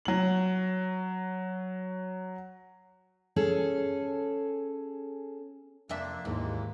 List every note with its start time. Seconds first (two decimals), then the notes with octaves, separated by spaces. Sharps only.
0.05 F#3 F#7
3.36 C#4 G#4 A4
5.89 F2 C3 A#3 D4 E5
6.25 D#2 G#2 E3 G#3 A#3